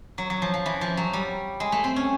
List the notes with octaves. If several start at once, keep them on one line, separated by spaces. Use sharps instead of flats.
F#3
F#3
F3
F3
E3
F3
F#3
G3
G#3
A3
C4
C#4